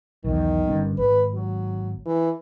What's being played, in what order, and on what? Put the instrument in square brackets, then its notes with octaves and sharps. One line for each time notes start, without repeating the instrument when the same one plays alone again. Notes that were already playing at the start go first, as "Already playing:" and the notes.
[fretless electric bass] B1 E2 [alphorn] D#3
[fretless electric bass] G1 G2 C#4
[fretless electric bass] G#1 [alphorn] B4
[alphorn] F#3
E3